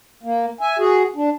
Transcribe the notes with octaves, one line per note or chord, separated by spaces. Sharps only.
A#3
E5 G#5
F#4 G#4
D4